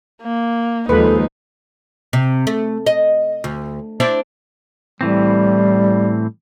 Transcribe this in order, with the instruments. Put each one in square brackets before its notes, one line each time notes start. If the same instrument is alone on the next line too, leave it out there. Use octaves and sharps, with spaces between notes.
[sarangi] A#3
[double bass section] D#2 F3 G#3 [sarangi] D#4 [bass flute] A4 [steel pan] B4
[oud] C3
A3
D#5
D2
C4 D4 E4
[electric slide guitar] A2 E3 C4 [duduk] G3